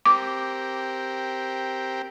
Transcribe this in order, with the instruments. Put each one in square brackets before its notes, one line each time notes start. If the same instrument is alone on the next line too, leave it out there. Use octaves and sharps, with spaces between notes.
[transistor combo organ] C4 G4 A#4 [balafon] D6